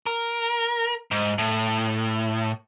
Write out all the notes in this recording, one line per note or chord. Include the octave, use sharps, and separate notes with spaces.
A#4
G#2
A2